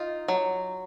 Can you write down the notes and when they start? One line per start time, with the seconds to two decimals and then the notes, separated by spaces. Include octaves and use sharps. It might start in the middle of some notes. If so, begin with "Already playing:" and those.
Already playing: D#4 F4
0.28 F#3